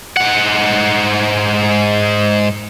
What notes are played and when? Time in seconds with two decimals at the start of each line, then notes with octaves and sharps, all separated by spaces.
0.17 G#2 F#5